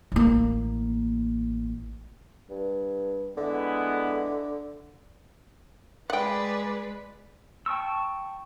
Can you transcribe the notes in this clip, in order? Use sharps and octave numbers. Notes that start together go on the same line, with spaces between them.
A1 A#3
G2
D3 G#3 B3 E4
G#3 G#4 B4 D5 F#5 G5
G5 A5 C#6 E6